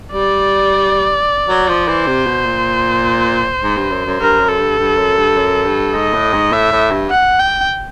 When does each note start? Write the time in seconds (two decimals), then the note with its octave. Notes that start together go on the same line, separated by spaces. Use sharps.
0.13 G3 D5
1.48 F#3
1.68 F3
1.88 E3 C5
2.07 C3
2.27 B2
2.46 A#2
3.62 G#2
3.77 G2
3.91 F#2
4.06 F#2
4.20 G2 A#4
4.39 F#2
4.49 A4
4.59 G2
4.78 G2
4.97 F#2
5.18 G2
5.37 F#2
5.65 G2
5.95 G#2 D#5
6.14 A2
6.34 G#2
6.52 A2 E5
6.72 A2
6.91 G2
7.10 F#5
7.40 G5